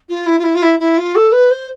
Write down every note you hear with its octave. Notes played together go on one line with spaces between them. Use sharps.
F4
E4
F4
E4
F4
E4
E4
F4
A4
B4
C5